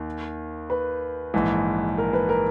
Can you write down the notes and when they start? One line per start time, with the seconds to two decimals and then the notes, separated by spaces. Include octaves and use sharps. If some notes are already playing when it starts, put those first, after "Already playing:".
Already playing: D#2 D#3
0.70 B4
1.34 A#1 G#2 E3
1.98 A#4
2.13 B4
2.29 A#4